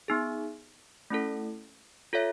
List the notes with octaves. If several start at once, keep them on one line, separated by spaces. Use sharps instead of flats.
B3 D#4 G#4
A3 C#4 E4 A4
F4 A4 C#5 E5